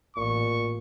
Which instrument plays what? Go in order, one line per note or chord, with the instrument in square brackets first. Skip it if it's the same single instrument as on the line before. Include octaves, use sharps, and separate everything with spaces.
[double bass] A1 [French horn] A#2 [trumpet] C#6